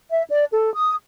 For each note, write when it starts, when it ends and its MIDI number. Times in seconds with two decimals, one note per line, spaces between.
0.11 0.23 76
0.29 0.44 74
0.52 0.73 69
0.74 0.94 87